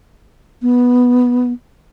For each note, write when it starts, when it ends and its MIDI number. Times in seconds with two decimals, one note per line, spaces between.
0.62 1.53 59